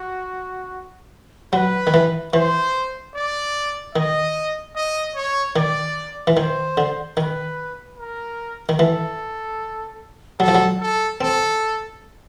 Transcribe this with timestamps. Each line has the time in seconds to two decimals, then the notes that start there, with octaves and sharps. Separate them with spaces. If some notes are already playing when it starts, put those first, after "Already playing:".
Already playing: F#4
1.53 F#3 B4
1.87 D#3
1.94 E3
2.34 E3 C5
3.14 D5
3.95 D#3 D#5
4.76 D#5
5.15 C#5
5.56 D#3 D5
6.27 E3
6.37 D#3 C5
6.77 D3
7.17 D#3 B4
7.98 A#4
8.69 D#3
8.79 E3 A4
10.40 F#3 A4
10.48 F3
10.55 F#3
10.80 A4
11.21 C4 A4